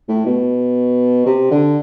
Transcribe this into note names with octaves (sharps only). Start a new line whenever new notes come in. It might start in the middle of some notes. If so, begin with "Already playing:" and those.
A2
B2
C3
D3